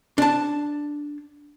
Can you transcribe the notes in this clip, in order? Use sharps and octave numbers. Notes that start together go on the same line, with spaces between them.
D4 A5